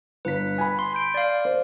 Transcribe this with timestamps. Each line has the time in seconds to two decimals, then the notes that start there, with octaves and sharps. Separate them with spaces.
0.25 G1 B4 B6
0.58 G#5 B5
0.79 C6
0.93 C6 G6 D7
1.14 D5 F5
1.45 C5